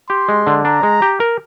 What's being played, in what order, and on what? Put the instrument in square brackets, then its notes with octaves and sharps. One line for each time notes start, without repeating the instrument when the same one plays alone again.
[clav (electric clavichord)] G4 [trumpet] C6
[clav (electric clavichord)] G#3
D3
[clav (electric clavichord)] D4 [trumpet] A#5
[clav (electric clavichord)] G#3
G4
A#4